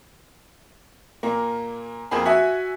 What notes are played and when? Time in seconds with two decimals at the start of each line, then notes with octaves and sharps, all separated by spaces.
1.23 A#2 A#3
2.11 F2 A#3 C4 G#4 B5
2.25 F#4 E5 G#5